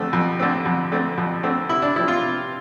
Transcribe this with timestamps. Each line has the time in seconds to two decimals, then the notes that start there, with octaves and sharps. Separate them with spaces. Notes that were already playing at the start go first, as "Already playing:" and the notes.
Already playing: F2 D3 A3 C4
0.13 F2
0.39 D3 A3 C4
0.65 F2
0.92 D3 A3 C4
1.18 F2
1.43 D3 A3 C4
1.69 C3 E4
1.82 D4
1.96 F3 C4 E4
2.08 F4
2.21 C3